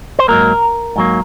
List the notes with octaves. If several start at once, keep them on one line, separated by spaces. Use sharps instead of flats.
C5
G#2 F#3 A#3 A#4
G#2 F#3 A#3